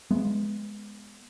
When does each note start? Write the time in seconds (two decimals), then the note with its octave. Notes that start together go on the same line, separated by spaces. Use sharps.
0.11 G#3 B3